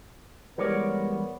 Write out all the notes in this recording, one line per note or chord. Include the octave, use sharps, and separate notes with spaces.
E3 G3 G#3 B3 A#4 C#5 D5